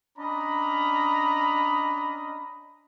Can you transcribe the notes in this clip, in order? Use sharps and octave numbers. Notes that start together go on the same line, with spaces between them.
C#4 D4 D#5 A#5 B5